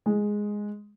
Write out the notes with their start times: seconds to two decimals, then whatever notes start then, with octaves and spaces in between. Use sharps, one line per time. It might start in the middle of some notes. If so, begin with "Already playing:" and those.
0.06 G#3